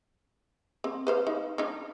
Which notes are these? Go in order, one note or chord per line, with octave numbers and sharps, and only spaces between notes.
C4
B4 C5 F5
D#4
D4 D#4